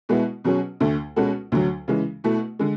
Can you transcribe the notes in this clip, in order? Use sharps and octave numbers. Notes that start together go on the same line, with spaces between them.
B2 G#3 B3 E4
B2 F#3 C#4 G#4
D2 D3 A3
B2 G#3 C#4 F#4 A4
D2 D3 F#3
C#3 E3 G#3
B2 A3 E4
D3 G#3